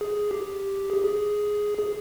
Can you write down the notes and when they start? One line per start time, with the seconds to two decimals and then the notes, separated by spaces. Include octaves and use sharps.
0.01 G#4
0.31 G4
0.90 G#4
1.05 G#4
1.78 G#4